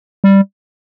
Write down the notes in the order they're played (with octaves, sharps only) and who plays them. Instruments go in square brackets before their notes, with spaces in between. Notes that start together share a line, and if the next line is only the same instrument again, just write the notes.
[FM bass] G3